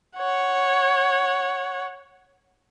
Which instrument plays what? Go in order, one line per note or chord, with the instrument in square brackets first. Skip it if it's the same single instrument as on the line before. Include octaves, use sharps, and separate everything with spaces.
[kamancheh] C#5 F#5